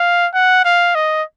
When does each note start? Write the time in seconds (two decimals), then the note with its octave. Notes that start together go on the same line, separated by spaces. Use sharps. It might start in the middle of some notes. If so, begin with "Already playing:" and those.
Already playing: F5
0.34 F#5
0.65 F5
0.95 D#5